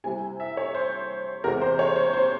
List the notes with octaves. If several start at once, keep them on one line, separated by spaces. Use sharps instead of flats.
C3 G3 C4 E4 G#5
E5
C#5
C5
E2 C3 E3 G#3 C4 A#4
C5
C#5
C5
C5